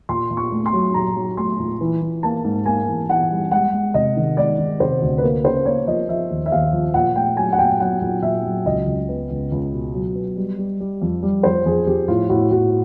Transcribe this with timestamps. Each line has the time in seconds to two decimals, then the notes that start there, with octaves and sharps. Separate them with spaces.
0.09 A#2 C6
0.31 A#2
0.37 C#6
0.52 A3
0.66 C6
0.73 F#3
0.94 A#2 A#5
1.16 F#3
1.37 A3 C6
1.60 A#2
1.81 E3
2.02 E3
2.23 A#3 A5
2.45 G#2
2.66 A#3 G#5
2.87 E3
3.09 E3 F#5
3.31 G3
3.51 G#3 F#5
3.73 G#3
3.94 C3 D#5
4.17 D#3
4.37 G#3 D5
4.58 D#3
4.80 C3 C5
5.02 D2
5.18 B4
5.23 A#3 A#4
5.44 C#3 C5
5.65 A#3 C#5
5.87 F3 D#5
6.09 F3 E5
6.30 D#2
6.46 E5
6.52 D#2 F5
6.73 F3
6.94 A#2 F#5
7.15 A3 G5
7.37 F#3 G#5
7.52 F#5
7.58 A#2 G5
7.80 F#3 F#5
8.02 A#2
8.22 A#2 E5
8.45 F#3
8.65 C#2 D#5
8.87 C#2
9.09 B3
9.30 C#2
9.52 C#2
9.73 B2
9.94 F#3
10.15 B3
10.37 G3
10.58 G3
10.80 G3
11.02 F2
11.23 G3
11.43 F2 C5
11.65 F2 G#4
11.87 F2 G4
12.08 A2 F4
12.29 A2 F#4
12.51 A2 F#4